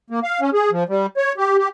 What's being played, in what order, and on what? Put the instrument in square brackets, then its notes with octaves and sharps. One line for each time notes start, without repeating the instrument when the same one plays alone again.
[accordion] A#3
F5
C#4
G#4
F3
G3
C#5
G4
G4